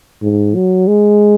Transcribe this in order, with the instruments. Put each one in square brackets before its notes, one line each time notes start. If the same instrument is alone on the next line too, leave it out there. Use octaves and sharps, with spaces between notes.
[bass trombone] G#2
F#3
G#3